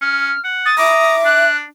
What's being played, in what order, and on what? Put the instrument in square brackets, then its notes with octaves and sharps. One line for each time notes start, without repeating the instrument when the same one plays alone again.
[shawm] C#4 [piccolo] F6
[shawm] F#5
[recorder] D#6 [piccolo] A6
[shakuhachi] E5 [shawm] A#5 [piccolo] D6
[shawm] D4 [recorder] F#6